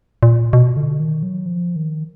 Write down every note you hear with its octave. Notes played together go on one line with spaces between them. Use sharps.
A#2
B2
D3
D#3
F#3
F3
D#3